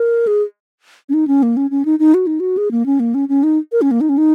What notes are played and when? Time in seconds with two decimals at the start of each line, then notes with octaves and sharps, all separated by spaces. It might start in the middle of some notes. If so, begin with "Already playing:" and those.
Already playing: A#4
0.27 G#4
1.09 C#4
1.14 D#4
1.28 C#4
1.43 A#3
1.57 C#4
1.71 C#4
1.85 D#4
1.99 D#4
2.14 F#4
2.27 D#4
2.40 F#4
2.57 G#4
2.71 A#3
2.86 C#4
3.00 A#3
3.14 C#4
3.29 C#4
3.43 D#4
3.72 A#4
3.82 C#4
3.91 A#3
4.01 D#4
4.09 C#4
4.18 D#4